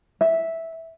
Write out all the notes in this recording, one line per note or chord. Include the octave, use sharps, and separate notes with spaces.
E5